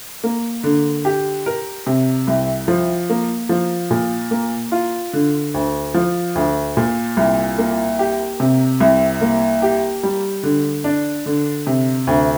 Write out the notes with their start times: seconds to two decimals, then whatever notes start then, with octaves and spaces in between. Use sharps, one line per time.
0.24 A#3
0.64 D3
1.05 G4
1.46 A#4
1.87 C3
2.27 C2
2.68 F3
3.10 A#3
3.49 F3
3.91 A#2
4.31 A#3
4.72 F4
5.13 D3
5.54 D2
5.94 F3
6.35 D2
6.77 A#2
7.17 C2
7.58 A#3
7.99 G4
8.40 C3
8.80 C2
9.21 A#3
9.62 G4
10.03 G3
10.43 D3
10.84 D4
11.26 D3
11.67 C3
12.07 D2